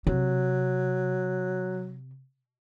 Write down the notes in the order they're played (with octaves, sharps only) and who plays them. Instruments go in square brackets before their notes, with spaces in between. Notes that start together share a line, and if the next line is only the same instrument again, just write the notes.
[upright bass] C3 [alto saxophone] F#3